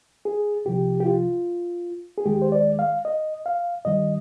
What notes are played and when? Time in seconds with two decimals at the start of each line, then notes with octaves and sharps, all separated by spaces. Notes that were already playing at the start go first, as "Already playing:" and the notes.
0.25 G#4
0.65 C2 C3 F3 G4
1.00 G4
1.05 F4
2.18 G#4
2.25 D#2 D#3 G#3 G4
2.42 C5
2.52 D5
2.79 F5
3.05 D#5
3.46 F5
3.85 G2 D#3 G3 D#5